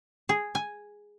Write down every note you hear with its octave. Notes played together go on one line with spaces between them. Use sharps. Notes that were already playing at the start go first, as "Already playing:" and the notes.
G#4
G#5